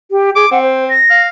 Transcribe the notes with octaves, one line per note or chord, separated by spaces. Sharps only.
G4
G#4 D6
C4 F#5
C5
A#6
F5